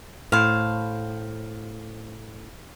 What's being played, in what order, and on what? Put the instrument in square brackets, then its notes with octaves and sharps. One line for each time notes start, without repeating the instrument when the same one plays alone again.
[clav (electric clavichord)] A2 [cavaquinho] C5 F5